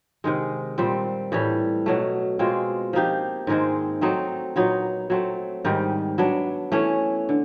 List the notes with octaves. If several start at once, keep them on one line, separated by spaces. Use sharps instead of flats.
C3 D#3 G#3
A#2 G3 C4
A2 E3 G3
B2 F#3 A3
B2 G#3 C4 F4
F3 A#3 D#4 G4
G#2 D#3 G#3 C4
F#3 A3 C4 D#4
A#2 F#3 B3 D#4
F#3 A3 C4
G#2 D#3 G3
F#3 B3 D4
E3 A3 C#4
D3